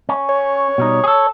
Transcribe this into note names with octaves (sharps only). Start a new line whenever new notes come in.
C#4
C#5
B2 G3 D#4
G#4 A4